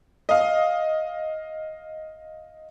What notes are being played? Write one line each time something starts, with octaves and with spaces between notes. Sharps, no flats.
D#5 F5